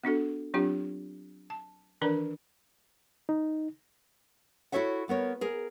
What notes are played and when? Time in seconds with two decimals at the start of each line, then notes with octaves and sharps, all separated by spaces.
0.04 B3 D4 F#4 A4
0.54 F#3 C4 D4 F4 G4
1.50 A5
2.01 D#3 E3 D4 A#4 B4 D5
3.29 D#4
4.72 E4 F#4 A4 C#5 E5 F#5
5.08 G3 B3 A#4 C#5
5.41 G#4 A#4